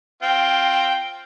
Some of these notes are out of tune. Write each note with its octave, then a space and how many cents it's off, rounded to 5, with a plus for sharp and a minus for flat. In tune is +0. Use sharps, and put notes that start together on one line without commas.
C4 +15 F4 +0 G5 +0